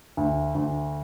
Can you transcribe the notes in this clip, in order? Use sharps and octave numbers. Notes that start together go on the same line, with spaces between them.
D2
D2